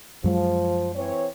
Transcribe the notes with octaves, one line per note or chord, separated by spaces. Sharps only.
F#2 F3 F#3 G#3
E3 C4 C#5